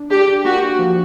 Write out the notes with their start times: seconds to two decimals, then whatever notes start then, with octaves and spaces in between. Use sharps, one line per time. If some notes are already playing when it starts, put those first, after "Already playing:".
Already playing: D4
0.10 D4 G4
0.44 A#3 F#4
0.79 F3